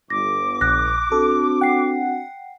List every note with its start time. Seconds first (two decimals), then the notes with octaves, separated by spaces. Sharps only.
0.10 G1 D6 A#6
0.61 A#1 F#6 A#6
1.12 C4 D4 F#4 A4
1.61 F#5 G5 C7